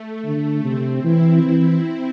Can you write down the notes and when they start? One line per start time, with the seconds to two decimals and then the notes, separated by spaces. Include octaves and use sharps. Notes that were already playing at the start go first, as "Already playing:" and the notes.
Already playing: A3
0.25 D3
0.65 C3 C4
1.04 E3 E4
1.44 E3